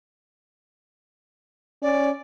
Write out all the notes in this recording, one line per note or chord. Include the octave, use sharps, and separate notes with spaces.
C#4 D5